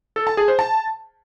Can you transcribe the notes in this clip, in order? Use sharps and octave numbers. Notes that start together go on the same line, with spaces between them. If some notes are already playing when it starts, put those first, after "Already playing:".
A4
A5
G#4
C5
A5